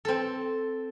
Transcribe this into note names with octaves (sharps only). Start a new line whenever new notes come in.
C4 A4